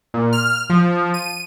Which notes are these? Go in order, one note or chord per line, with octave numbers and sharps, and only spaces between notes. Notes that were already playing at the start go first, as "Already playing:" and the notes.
A#2
F6
F3
D#7